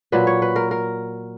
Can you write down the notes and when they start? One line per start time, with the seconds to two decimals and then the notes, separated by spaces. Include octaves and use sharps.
0.12 A#2 F#3 B4
0.27 C#5
0.42 B4
0.56 A#4
0.71 A#4